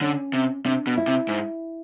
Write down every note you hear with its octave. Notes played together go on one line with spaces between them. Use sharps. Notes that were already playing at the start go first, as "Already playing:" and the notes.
D3 C#4
C3
C3 D4
B2
E4
C3
G#2